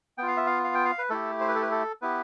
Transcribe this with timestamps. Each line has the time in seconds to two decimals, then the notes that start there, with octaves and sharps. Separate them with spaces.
0.18 B3 F4 G5
0.28 F5
0.37 E5
0.46 F5
0.64 F5
0.75 G5
0.85 F5
0.98 B4
1.10 A3 E4 G4 A4
1.40 C5
1.48 B4
1.55 A4
1.62 B4
1.71 A4
2.02 B3 E4 G4 B4